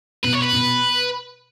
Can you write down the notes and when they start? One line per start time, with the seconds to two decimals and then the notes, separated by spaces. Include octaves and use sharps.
0.24 B2 B4
0.34 C#5
0.42 B4
0.53 B2